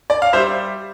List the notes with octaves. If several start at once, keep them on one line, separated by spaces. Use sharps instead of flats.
D5
F5
G3 C5 E5